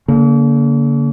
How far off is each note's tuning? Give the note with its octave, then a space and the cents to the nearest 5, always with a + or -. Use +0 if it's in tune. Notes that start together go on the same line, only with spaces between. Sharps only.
D3 -45 A#3 +0